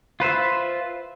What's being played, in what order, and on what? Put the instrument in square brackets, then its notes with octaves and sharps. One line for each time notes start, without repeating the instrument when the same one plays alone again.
[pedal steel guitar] F4 B4 C5 E5